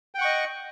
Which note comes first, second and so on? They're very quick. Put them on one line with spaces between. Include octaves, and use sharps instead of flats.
G5 F#5 C#6 D#5